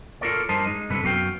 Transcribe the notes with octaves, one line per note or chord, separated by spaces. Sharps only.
F4 A4 A#4 C#5 D5
G2 G4 A#4 C5 D#5 A5
G#3 D#4
G2 C3 A4 B4
F#2 B3 F#4 F5 G5